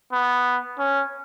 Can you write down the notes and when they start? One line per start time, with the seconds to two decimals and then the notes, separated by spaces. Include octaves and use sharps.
0.12 B3
0.79 C#4